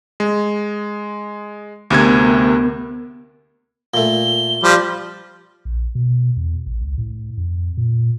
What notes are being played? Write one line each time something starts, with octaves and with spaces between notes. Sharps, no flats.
G#3
D2 C3 B3 A#4 G#6
A#2 A3 G7
F3 G3
A#1
B2
E2
A1
C#2
A2
F2
A#2